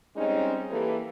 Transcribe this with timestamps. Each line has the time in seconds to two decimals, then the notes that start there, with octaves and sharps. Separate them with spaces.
0.16 G3 G#3 C4 C#4 D#4
0.71 E3 A#3 G4 A4 B4